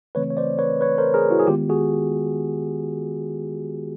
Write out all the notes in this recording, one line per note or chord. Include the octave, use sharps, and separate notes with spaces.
C#3 E3 A3 C4 B4 C#5
C#5
C5 D5
B4 C#5
B4 C#5
A#4 C5
G#4 A#4
E4 F#4
G#4
D#3 G#3 B3 F4 G4
F#4 G#4